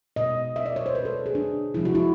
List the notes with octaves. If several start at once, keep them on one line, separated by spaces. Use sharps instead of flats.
B2 G#3 D#5
E5
D5
C#5
C5
B2 G#3 B4
A4
G#4
D4
C3 F3 G#3 E4
F#4
E4